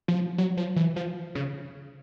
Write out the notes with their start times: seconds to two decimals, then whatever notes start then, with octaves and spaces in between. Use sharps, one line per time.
0.08 F3
0.38 F#3
0.57 F3
0.76 E3
0.96 F3
1.35 C#3